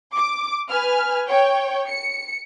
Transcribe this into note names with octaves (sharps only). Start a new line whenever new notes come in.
D6
B4 G#5 F6
C#5 G5
C#7